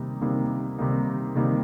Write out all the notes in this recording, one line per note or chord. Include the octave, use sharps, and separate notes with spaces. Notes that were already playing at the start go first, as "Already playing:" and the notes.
Already playing: C3 D#3 G3 A#3 D#4
C3 D#3 G3 A#3 D#4
C3 D#3 G3 A#3 D#4
C3 D#3 G3 A#3 D#4